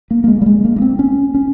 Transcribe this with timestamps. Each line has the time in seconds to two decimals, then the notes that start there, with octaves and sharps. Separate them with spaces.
0.11 A#3
0.24 A#3
0.28 G#3
0.42 G3
0.46 G#3
0.65 A#3
0.76 A#3
0.82 C4
0.99 C#4
1.34 C#4